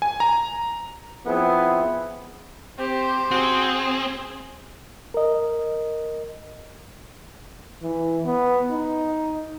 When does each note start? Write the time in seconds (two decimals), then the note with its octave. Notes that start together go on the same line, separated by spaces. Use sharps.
0.02 G#5
0.20 A#5
1.26 F3 B3 C4 E4 G#4
2.79 C4 G4 C5
3.31 C4 F#4 G#4
5.14 A#4 D#5
7.83 E3
8.25 B3
8.71 D#4